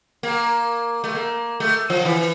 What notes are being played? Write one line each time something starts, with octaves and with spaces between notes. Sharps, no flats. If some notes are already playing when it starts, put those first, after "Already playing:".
A#3
A3
A#3
A3
F3
E3